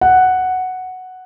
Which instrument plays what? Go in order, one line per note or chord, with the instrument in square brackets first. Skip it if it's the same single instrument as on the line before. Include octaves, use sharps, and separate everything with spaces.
[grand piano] F#5